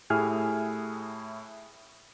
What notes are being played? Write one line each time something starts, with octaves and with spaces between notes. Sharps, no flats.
A2 E4 G4 G#4 G#5 F6